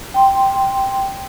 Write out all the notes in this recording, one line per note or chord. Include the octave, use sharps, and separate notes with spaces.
G5 C6